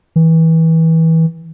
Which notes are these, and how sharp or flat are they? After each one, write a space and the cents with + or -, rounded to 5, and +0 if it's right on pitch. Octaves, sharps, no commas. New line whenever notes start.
E3 -25